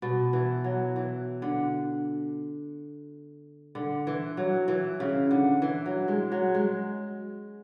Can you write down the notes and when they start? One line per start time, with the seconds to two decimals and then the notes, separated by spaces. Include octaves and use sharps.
0.02 B2
0.33 E3
0.64 F#3
0.96 E3
1.42 D3
3.75 D3
4.07 E3
4.37 F#3
4.68 E3
5.00 C#3
5.31 D3
5.62 E3
5.86 F#3
6.08 G#3
6.32 F#3
6.55 G#3